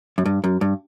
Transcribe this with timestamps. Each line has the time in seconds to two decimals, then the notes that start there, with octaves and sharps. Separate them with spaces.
0.18 F#2
0.26 G2
0.44 F#2
0.61 G2